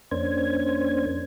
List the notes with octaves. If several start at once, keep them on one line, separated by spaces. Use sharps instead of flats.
F2 A#3 C#4 D4 C5 G#6